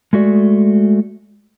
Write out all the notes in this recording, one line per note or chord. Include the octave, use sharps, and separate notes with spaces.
G#3 A3 F#4 D5